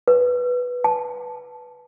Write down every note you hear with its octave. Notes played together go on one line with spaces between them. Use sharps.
B4
A5